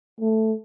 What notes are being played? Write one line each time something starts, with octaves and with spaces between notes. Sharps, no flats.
A3